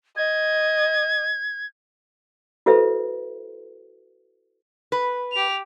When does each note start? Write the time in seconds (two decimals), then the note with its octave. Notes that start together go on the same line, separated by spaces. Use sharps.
0.17 D#5 G#6
2.66 E4 F#4 A4 B4 C5 E5
4.92 B4
5.32 G4 F7